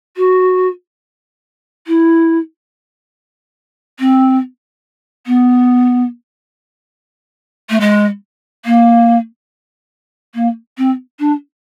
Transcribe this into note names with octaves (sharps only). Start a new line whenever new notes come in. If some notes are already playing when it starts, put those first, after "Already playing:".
F#4
E4
C4
B3
A3
G#3
A#3
A#3
C4
D4